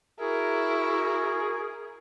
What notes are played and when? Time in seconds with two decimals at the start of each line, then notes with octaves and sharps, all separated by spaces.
0.20 E4 F#4 G#4 A#4